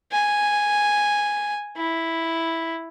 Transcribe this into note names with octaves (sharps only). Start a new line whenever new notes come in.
G#5
E4